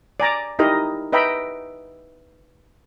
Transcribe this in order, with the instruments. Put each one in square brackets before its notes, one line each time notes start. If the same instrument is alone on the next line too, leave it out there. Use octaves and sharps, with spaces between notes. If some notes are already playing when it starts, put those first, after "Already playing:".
[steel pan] D5 G#5 A#5 D6
D#4 E4 G4 A#4 D#5
B4 D#5 E5 G5 A#5 B5